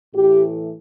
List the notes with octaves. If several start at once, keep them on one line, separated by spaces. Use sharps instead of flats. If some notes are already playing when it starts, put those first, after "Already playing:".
A2 E3 A3 G4